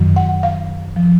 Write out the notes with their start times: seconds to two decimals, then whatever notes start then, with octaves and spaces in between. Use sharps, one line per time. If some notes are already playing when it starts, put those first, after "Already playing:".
Already playing: F#2 D#3 F#3
0.16 F#5
0.43 F5
0.96 F3